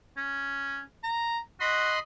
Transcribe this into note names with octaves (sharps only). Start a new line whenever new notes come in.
C#4
A#5
F#4 D#5 B5 C6